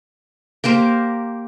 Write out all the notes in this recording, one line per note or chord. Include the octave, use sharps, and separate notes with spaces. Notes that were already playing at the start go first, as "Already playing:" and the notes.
A#3 G4 A#4 C5